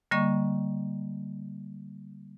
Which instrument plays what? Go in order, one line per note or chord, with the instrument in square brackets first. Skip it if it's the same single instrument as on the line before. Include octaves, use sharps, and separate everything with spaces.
[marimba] D3 G3 A#3 D#5 C#6